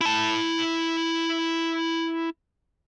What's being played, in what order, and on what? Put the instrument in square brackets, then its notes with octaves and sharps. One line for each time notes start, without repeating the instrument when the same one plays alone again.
[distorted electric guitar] E4 A5